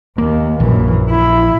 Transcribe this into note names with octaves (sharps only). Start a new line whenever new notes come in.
D#2 A#3
A#1 F#2 E3
E4